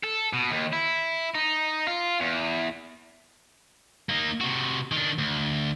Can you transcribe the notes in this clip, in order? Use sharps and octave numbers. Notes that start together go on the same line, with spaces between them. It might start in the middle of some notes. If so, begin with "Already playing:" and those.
A4
B2
D#2
E4
D#4
F4
E2
A#3 D#4
C3 F#4
D#3 D4
D2